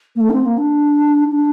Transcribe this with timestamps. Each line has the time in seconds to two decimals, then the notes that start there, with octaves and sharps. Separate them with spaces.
0.15 A#3
0.20 A3
0.29 D4
0.33 C4
0.45 A#3
0.58 D4
1.32 D4